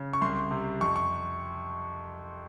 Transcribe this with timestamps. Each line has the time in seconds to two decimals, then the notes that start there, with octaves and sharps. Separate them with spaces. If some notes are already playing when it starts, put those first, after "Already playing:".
Already playing: C#3
0.13 C#6
0.22 C2 C6
0.51 C3
0.81 F2 C#6
0.96 C#6